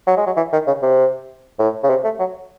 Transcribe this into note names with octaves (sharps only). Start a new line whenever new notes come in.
F#3
G#3
F#3
E3
D#3
C#3
C3
A2
C#3
C3
A3
F#3